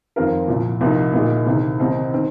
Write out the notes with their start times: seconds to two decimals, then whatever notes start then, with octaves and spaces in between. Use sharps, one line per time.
0.16 F2 D#3 C4 F4 A#4
0.48 C2 A#2 F3
0.81 C2 C3 F3 A#3 D#4
1.14 C2 A#2 A#3 D#4 G#4
1.46 C2 C3 D#3
1.80 C2 C3 D#3 C4 D#4
2.13 D#3 C4